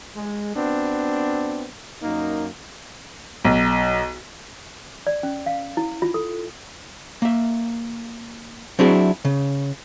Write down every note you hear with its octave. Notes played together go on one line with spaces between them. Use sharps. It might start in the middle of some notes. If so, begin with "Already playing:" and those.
G#3
B3 C4 D4 F#4
F#2 A#3 D#4
B1
D5
C#4
F5
E4
F4
A4
A#3 E5
F#3 C4 D4 E4 F#4 G#4
C#3